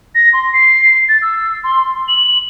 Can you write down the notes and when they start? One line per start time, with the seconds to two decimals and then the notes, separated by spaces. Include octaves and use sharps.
0.15 A#6
0.33 C6
0.53 C7
1.09 A6
1.22 E6
1.64 C6
2.08 F#7